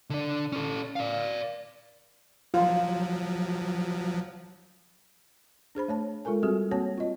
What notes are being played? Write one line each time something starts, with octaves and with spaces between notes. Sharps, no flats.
D3 D4
C#4 A4
D5 F5
F3 F#3 F4
D4 G#4 C5 B5
A3 C#5 A5
G#3 F4 A4 A#4 G#5
G3 C4 F#4 G#4 A4
A#3 C4 F#4 C#5 A5
F4 D#5